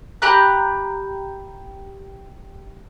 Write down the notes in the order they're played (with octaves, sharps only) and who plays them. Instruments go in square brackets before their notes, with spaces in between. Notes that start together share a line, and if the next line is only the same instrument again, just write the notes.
[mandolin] G4 A#5 B5 F#6